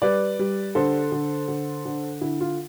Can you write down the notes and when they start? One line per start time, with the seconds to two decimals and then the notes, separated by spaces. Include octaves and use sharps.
0.02 G3 B4 D5
0.39 G3
0.75 D3 A4 C5
1.12 D3
1.48 D3
1.85 D3
2.21 D3 E4
2.41 F4